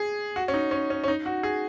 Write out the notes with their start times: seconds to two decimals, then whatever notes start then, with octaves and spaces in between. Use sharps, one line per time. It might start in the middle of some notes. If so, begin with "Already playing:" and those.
Already playing: G#4
0.36 F#4
0.48 C#4
0.54 D#4
0.71 C#4
0.90 C#4
1.04 C#4
1.08 D#4
1.26 F#4
1.43 G#4